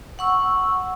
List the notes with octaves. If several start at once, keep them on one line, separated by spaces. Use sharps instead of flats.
F#5 C#6 E6